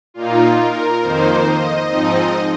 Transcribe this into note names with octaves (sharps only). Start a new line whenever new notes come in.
A#2 A#3 D#4 F4
A#4
F2 D#3 A#3 D#4 C5
D#5
G#2 F3 C4 D#4